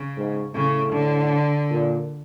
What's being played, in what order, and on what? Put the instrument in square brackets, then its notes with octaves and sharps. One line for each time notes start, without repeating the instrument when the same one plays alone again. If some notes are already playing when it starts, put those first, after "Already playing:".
Already playing: [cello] C#3
[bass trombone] G#2
[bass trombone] A2 [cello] C#3
[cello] D3
[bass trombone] A#2